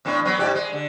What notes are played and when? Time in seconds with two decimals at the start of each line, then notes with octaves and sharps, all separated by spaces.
0.05 E2 A2 D4
0.25 F#3 B3
0.38 G#2 G4 D5
0.55 G#3
0.73 D3